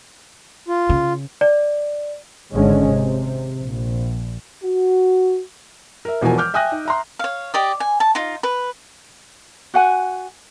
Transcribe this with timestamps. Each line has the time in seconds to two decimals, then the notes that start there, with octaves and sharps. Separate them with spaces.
0.68 F4
0.89 C#3
1.41 D5
2.52 G#1 D3 G#3 C#4
2.88 C3
3.60 A#1
4.64 F#4
6.05 A#4 E5
6.21 E1 B2 E3 F3 A#4 G#5
6.38 D6 F6 G6
6.54 E5 G5 G#5 D#6 F#6 A#6
6.72 D#4
6.85 E5 A#5 C6
7.19 C#5 F5
7.54 G4 D5 D#5
7.80 G#5
8.00 A5
8.15 D#4 F4
8.43 B4
9.74 F#4 F#5 G#5